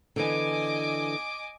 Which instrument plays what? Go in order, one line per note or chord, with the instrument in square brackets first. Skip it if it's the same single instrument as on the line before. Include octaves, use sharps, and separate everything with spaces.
[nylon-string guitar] D3 E3 B3 [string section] D#5 G#5 D6